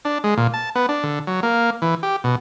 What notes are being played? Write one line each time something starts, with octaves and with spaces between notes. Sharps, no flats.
D4
G#3
A#2
A5
B3
D4
D3
F#3
A#3
E3
G4
B2